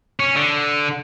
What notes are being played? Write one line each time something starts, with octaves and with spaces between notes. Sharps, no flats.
C#4
D3